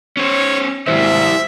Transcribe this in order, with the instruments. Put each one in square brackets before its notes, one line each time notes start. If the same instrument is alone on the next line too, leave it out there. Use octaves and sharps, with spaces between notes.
[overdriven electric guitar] C#4 C5 [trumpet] C#5
[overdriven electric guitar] D#2 G#2 [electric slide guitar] E4 G4 C5 [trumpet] E5